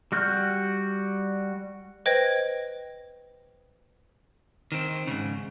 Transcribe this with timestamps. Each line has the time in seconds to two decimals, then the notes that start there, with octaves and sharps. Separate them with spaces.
0.12 G3 F#4 F6 G6
2.06 B4 C5 D#5 G5 G#6 A#6
4.72 D#3 C4
5.07 G#2 C#3